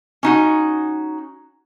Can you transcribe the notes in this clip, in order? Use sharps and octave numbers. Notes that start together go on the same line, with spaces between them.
C#4 D#4 F#4